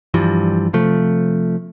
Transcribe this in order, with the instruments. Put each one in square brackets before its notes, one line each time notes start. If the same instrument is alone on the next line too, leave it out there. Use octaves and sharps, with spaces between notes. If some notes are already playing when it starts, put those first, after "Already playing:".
[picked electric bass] G2 E3 F3 G3
C3 F3 A3